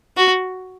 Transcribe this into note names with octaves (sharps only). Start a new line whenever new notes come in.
F#4